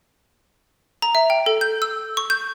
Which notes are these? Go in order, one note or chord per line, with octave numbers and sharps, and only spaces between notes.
A#5
E5
G5
A4
G6
E6
C#6
G6